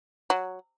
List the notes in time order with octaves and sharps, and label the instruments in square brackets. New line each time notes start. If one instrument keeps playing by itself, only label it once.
[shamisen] F#3